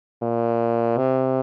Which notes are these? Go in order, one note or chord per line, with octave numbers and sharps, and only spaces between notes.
A#2
C3